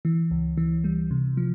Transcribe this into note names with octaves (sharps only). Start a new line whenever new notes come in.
E3
C#2
E3
G3
C3
F3